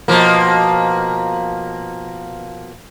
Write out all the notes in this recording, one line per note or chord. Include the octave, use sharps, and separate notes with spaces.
B2 F3 A#3